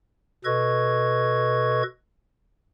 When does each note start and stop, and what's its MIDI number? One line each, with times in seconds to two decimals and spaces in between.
0.45 1.83 47
0.45 1.83 69
0.45 1.83 71
0.45 1.83 75
0.45 1.83 85
0.45 1.83 92